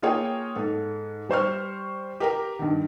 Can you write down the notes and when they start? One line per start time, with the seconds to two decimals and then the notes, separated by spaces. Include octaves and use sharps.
0.02 A#3 F4 G#4 C#5 G5
0.56 G#2 A4
1.29 G3 C5 C#6 F6
2.20 G4 A#4 A#5
2.59 G2 D#3